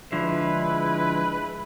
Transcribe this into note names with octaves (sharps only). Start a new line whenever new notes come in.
D3 F3 G#3 E4 B4